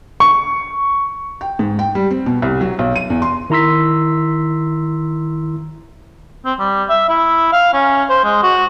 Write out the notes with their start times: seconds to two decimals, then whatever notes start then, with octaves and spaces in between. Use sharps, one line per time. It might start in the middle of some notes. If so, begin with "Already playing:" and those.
0.20 C#6
1.41 G5
1.59 G#2
1.79 G5
1.95 G3
2.11 C4
2.26 B2
2.42 C2
2.61 F#3
2.79 B1
2.96 D#7
3.10 E2
3.22 C6
3.50 D#3 E4 A#5 C6 E6 B6
6.45 C4
6.59 G3
6.90 E5
7.10 E4
7.53 F5
7.73 C#4
8.10 C5
8.25 G#3
8.43 F#4